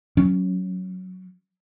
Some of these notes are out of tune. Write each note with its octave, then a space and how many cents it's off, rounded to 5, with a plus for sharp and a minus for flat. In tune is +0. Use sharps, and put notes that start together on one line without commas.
F#3 +0 C#4 +0